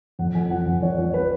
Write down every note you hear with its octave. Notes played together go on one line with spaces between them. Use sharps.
F2 F#5
F2 G#5
F3 F#5
F2
F3 C#5
F3 C#5
B4